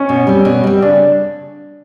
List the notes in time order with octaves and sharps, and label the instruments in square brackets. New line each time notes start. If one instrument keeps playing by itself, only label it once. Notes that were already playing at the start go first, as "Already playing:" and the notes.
Already playing: [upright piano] C#4
[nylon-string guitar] B2
G3 C4
B2
G3 C4
[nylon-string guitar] C#3 [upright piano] D4